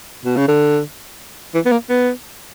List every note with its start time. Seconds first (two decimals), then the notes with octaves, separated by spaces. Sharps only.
0.25 B2
0.37 C#3
0.48 D3
1.54 E3
1.65 B3
1.71 A#3
1.89 B3